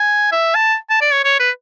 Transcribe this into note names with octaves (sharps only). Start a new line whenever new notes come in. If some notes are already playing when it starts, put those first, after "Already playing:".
Already playing: G#5
E5
A5
A5
D5
C#5
C#5
B4